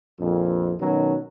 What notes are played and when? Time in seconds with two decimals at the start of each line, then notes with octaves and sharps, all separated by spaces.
0.20 A#1 F2
0.80 B2 D#3 F#3 C#4